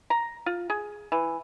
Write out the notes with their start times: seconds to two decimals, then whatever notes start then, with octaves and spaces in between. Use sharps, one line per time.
0.10 A#5
0.46 F4
0.70 G#4
1.12 E3